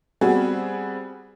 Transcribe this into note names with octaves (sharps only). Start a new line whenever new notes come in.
G3 B3 C4 F#4 G#4